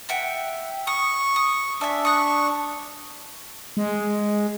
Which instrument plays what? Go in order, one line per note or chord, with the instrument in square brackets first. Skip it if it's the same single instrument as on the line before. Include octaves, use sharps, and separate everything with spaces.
[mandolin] E5 F#5 G5
[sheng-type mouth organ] C#6 [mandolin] D#6
[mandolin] D#6
[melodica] D4 [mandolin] E5 G#5
[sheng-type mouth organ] C#6 [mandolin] D#6 F#6
[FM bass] G#3